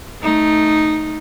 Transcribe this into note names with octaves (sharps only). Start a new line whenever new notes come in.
A3 D#4